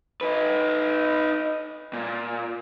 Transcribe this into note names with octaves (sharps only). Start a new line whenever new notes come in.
D#4 B4
A#2